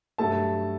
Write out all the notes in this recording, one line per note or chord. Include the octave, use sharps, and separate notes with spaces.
G2 F#3 A3 A5